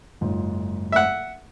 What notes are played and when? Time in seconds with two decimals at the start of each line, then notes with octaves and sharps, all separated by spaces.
0.21 F#1 G#2 F4
0.92 E5 F#5